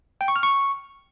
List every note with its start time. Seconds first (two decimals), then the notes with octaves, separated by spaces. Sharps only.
0.21 G5
0.28 C#6
0.36 F6
0.43 C#6